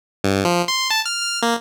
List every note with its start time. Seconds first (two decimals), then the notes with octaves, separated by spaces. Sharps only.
0.24 G2
0.45 F3
0.68 C6
0.90 A5
1.06 F6
1.22 F6
1.42 A#3